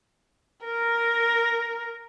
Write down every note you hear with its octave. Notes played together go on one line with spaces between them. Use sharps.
A#4